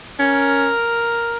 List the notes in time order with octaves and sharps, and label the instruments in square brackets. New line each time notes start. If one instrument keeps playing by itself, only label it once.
[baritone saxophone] C#4 [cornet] A#4